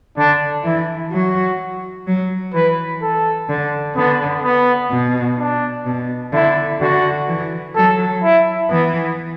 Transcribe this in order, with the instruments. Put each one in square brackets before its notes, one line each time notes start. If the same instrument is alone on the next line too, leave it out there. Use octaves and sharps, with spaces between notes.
[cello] D3 [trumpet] D4
[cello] E3 [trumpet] E4
[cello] F#3 [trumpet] F#4
[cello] F#3
[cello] E3 [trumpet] B4
[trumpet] A4
[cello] D3
[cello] D3 [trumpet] B3
[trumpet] B3
[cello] B2
[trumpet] D4
[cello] B2
[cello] D3 [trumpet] E4
[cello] D3 [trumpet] F#4
[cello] E3
[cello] F#3 [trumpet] A4
[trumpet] E4
[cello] E3 [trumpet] B3